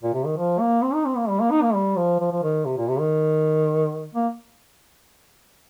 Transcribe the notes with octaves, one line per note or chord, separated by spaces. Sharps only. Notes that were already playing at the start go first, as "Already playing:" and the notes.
A#2
C3
D#3
F3
A#3
C4
D#4
C4
A#3
G3
A#3
D#4
A#3
G3
F3
F3
F3
D#3
C3
A#2
C3
D#3
A#3